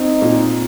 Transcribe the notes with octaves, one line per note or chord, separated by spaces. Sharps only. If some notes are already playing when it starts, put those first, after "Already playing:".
Already playing: C4 D#4
A#2